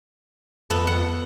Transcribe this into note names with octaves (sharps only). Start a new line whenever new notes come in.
F2 B3 A4
F#5